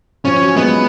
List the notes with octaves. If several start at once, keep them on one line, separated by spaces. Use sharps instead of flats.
F3 C#4
F#3
G#3 B3